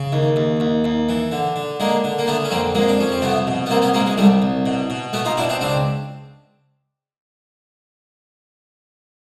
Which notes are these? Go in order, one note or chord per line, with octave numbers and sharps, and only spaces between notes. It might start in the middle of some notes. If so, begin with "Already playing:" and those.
Already playing: C#3
D#2
D#2
D#2
D#2
E3
D3
D3
D3 G#3 A#3
D3
A#3
D3 A3 B3
C#4
F2 A#3 C4
F2 G#3 A#3
D4
F2 C#4
C4
C2 A3 B3
B2
B3
C2 A#3 C4
B3 C#4
B2 G#3 A#3
G#3
C2 G3 A3
C2
B2
B2
B2 A3 B3
D#4 F4
B2 D4 E4
C4 D4
C#2 C4 D4